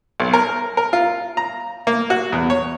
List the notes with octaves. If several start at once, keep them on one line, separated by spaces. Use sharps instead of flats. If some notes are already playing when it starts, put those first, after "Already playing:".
B1
A#4
A#4
F4
A#5
A#3
F#4
E2
C#5